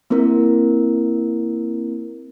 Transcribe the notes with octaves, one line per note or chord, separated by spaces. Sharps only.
A#3 C4 E4 A#4